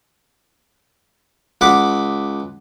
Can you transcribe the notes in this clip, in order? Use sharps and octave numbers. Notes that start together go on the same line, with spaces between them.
C#2 F#5 B5 D6